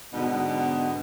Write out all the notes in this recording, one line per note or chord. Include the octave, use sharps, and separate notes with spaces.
G#2 B2 D3 B3 D#4